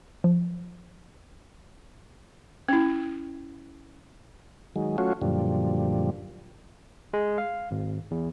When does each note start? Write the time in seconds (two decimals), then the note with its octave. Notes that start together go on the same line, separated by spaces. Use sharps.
0.24 F3
2.69 C#4 E4
4.76 D#3 F#3 G#3
4.98 F#3 A3 C#4 F4 F#4
5.22 F#2 A#2 D3 F3 G3
7.13 G#3
7.38 F5
7.71 G#1
8.11 E2